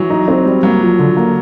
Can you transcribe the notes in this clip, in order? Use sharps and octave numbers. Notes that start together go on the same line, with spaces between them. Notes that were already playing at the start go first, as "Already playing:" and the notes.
Already playing: E3 F#3
D#4
C4
G3
F#3 A#3
F3
D3
A#3